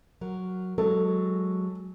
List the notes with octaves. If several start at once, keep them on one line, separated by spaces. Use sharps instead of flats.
F#3 A#4
F#3 G#3 A4